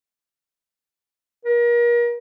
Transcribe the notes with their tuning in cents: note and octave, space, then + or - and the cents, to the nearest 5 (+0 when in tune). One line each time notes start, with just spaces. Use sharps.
A#4 +35